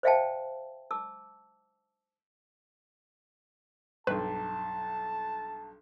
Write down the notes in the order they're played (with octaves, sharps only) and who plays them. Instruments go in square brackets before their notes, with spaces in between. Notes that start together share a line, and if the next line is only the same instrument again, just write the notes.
[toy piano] C5 D5 E5 F5 G5 A5
A5 D6 E6
[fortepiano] B1 G2 [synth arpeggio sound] B4 [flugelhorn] A5